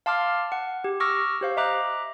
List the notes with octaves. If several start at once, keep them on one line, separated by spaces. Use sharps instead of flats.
F5 A5 C6 D6 F6
F#5
G4
C#6 D6 E6 F6 A#6
G4 C5 F5
D#5 E5 A#5 D6 F#6